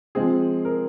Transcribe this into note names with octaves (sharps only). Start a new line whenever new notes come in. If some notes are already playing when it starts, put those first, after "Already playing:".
F3 G#3 C4 G#4
A#4